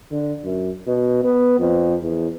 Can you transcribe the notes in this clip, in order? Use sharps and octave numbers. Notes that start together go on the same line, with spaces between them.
D3
F#2
B2
B3
F2
E2